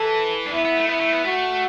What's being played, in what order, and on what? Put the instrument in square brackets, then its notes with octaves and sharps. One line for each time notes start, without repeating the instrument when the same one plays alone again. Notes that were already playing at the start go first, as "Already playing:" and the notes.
Already playing: [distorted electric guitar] E3 [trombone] A4
[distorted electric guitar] D4
[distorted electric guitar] B3 [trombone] E4
[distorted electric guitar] B3
A3
[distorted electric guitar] B3 [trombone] E4
[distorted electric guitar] A3
B3
[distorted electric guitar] A3 [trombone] F#4